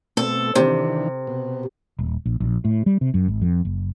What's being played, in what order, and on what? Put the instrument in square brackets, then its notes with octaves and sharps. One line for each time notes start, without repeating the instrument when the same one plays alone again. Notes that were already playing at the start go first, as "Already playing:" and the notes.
[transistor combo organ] B2 A3 C4 [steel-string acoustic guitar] A4
[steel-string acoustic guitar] C3 [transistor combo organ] D#3 E3 D4
[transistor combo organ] B2
[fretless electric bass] D#1
A#1
A#1
A2
G3
C3
F#2
G#1
F2
F#1